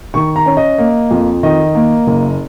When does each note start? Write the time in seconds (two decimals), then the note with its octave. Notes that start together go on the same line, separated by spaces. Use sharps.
0.14 D#3 C#6
0.36 A#5
0.46 C#4
0.57 D#5
0.78 A#3
1.11 F2
1.43 D#3 D#5
1.75 A#3
2.07 F#1